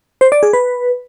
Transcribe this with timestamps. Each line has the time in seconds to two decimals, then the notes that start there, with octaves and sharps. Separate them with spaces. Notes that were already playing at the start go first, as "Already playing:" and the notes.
0.21 C5
0.32 D5
0.43 G#4
0.53 B4